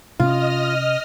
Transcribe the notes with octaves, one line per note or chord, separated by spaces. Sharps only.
C3 C#4 F4 D#5 D#6 F6